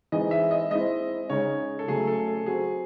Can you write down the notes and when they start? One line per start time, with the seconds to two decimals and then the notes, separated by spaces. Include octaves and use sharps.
0.12 E3 G#3 C4 D#4 G#4 D#5
0.31 E5
0.51 D#5
0.71 G#3 C4 E4 D#5
1.30 C#3 G#3 D#4 G#4 C#5
1.79 A4
1.88 C#3 F#3 A3 G#4
2.07 A4
2.28 A4
2.46 F#3 C4 F#4 G#4